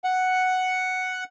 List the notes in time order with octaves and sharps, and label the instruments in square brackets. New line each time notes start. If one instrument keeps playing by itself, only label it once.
[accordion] F#5